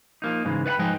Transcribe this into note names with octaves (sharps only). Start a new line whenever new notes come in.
F3 A#3 D#4
G#2 C#3 E3 G#3
B4 D5 F#5 G5 B5
G#2 F3 G#3 B4 D#5 G5